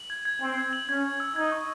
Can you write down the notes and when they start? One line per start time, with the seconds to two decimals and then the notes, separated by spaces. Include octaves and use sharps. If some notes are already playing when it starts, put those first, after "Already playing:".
Already playing: F#7
0.10 G#6
0.25 G#6
0.41 C4 G#6
0.57 G#6
0.73 F#7
0.89 C#4 G#6
1.05 G#6
1.20 E6
1.36 D#4 G#6
1.52 C#6